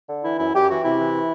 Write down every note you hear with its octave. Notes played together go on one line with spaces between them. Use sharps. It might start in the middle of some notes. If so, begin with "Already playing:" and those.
D3
E3 E4
F#2 E4
F#2 G4
E3 F#4
C3 E4
E3